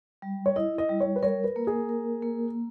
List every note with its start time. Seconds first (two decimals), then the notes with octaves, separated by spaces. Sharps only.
0.22 G3
0.46 C#5
0.56 E4 D#5
0.78 D#5
0.89 G3
1.00 C#5
1.16 B4
1.23 A#4 C#5
1.44 B4
1.56 A#3
1.67 G#4
1.89 A#4
2.23 A#3